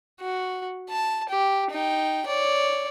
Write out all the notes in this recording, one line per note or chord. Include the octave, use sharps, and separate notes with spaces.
F#4
A5
G4
D#4 G5
C#5 D5